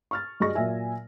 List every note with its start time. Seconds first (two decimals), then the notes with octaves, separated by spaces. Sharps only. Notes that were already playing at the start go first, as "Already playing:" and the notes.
0.11 C#6 F6 A6
0.40 G2 F#4 G#4 D#5 C#6 A#6
0.55 A#2 F#3 E5 G#5